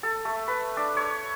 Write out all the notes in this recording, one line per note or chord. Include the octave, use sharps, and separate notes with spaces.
A4
A3
B4
D4
C#5